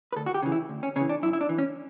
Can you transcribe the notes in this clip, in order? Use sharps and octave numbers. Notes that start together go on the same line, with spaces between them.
B4
D2 A4
F#4
G4
C#3 E3
E4
D2
C#4
C#3 E3 C#4
D4
F#2 E4
E4
D4
E3
C#4